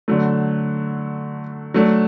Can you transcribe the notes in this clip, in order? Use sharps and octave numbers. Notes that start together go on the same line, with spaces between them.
D3 F#3 A3
F#3 A3 D4